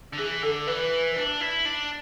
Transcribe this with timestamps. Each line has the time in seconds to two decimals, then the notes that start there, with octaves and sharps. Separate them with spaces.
0.13 D3
0.18 E3 G#4
0.43 D3 A4
0.67 E3 B4
1.16 D4
1.41 E4
1.65 D4